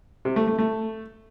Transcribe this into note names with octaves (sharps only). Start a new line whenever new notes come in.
C3
A3
A3
A3